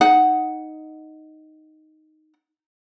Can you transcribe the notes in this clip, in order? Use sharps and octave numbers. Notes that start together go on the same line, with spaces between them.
D#4 F#5